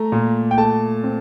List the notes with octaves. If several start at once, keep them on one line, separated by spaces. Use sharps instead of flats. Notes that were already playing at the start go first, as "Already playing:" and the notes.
Already playing: A3 A#5
A#2
G5
A3 A5
C4